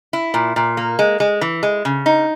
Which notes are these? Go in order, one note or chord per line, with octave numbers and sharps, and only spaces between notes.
E4
A#2
A#2
A#3
G#3
G#3
E3
G#3
C#3
D#4